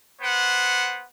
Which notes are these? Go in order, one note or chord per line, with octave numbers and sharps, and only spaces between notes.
B3 C5 F#5